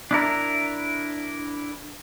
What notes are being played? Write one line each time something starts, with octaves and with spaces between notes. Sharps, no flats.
D4 E4 A#4